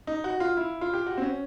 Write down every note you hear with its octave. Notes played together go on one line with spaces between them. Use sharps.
D#4
F#4
F4
E4
F4
G4
F#4
C4
C#4